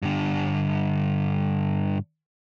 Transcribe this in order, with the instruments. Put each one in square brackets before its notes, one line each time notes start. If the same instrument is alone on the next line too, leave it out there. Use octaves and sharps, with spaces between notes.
[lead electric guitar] G2 D3